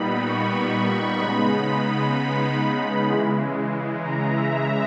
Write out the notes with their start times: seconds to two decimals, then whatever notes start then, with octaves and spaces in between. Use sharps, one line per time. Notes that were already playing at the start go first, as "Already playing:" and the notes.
Already playing: A#2 G3 B3 D#4 B5
0.25 C#6
0.72 B5
1.19 C#3 G#3 B3 D#4 B5
3.07 C#3 E3 G#3
4.02 A#5
4.33 E5